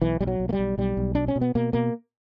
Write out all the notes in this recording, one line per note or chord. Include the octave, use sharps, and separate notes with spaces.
B1 E3
B1 G3
F#3
B1
A#3
G3
B1
B1 G3
B1
B2 D4
C#4
B2
B3
B2 A#3
B2 A#3